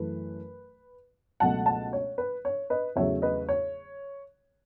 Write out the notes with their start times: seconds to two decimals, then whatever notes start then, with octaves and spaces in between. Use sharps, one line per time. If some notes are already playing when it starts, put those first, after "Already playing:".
Already playing: F#2 E3 A3 B4
1.40 C#2 B2 F#3 A3 F#5 A5
1.66 F#5 A5
1.93 C#5
2.18 B4
2.45 C#5
2.70 B4 D#5
2.96 E2 C#3 F#3 A3 C#5 E5
3.22 B4 D#5
3.49 C#5